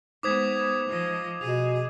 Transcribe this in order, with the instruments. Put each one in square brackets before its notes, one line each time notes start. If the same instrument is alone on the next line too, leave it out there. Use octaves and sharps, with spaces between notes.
[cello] G#3 B3 [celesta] D#4 C5 B6 [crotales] D6 D#6 G#6
[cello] F3 D#5
[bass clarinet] B2 [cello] G#4 [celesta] F7